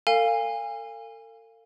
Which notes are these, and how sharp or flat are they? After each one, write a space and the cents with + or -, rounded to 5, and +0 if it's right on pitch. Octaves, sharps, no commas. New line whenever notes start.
A4 +45 F5 +0 G#5 -30